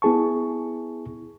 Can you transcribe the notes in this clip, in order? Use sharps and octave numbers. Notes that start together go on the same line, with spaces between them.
B3 E4 G#4 A5 C#6